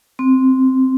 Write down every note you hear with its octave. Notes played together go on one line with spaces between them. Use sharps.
C4